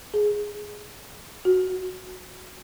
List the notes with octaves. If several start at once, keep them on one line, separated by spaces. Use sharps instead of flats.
G#4
F#4